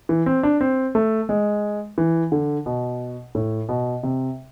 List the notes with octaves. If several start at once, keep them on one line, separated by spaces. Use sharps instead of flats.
E3
C4
D4
C4
A3
G#3
E3
D3
B2
A2
B2
C3